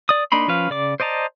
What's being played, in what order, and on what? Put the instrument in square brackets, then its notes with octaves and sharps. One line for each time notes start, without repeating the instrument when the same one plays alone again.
[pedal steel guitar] D5 D#6
A#3 D4 D#4 B5 C6
F3 C#4 B4 F5
C#3 D5 D6
C5 D5 D#5 A5 A#5